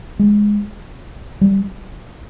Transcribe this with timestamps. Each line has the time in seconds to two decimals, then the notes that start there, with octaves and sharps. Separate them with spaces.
0.19 G#3
1.41 G3